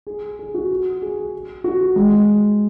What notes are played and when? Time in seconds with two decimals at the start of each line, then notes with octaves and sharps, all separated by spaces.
0.07 G#4
0.39 G#4
0.54 F#4
1.02 G#4
1.64 F#4
1.96 G#3